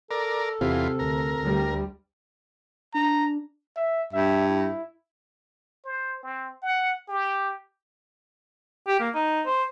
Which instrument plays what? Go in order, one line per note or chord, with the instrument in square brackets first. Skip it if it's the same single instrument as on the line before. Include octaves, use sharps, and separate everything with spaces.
[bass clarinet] A4 [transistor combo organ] A#4 D5
[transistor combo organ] E2 F4 [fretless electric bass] C3
[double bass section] D2 [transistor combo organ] A#4
[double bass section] D2 G3
[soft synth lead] D4 [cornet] A#5
[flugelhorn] E5
[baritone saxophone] G2 [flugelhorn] E5
[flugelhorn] E4
[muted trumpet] C5
C4
F#5
G4
[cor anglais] G4
A#3
D#4
C5